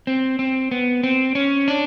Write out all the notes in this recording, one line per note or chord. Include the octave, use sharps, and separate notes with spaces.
C4
C4
B3
C4
C#4
D4